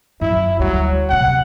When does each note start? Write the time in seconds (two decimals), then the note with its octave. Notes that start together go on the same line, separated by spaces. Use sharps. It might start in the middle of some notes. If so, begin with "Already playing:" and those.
0.21 F#2 E4
0.59 D2 F#3 G3
1.10 F#2 C3 F#5